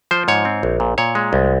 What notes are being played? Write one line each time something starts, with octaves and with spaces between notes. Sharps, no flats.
F3 C5
G#2 C#5
C4
A#1
A#2
A#2 C#5
G#3
C2